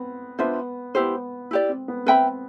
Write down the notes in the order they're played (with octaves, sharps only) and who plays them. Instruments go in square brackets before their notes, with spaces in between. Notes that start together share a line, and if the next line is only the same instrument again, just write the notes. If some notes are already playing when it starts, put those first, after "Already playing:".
Already playing: [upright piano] B3 C4
[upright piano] B3 [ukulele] D4 F4 C5 E5
[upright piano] B3 [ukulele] E4 G4 C5
[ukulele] E4 G4 D5
[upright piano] C4
B3
[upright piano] C4 [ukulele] B4 E5 G5 B5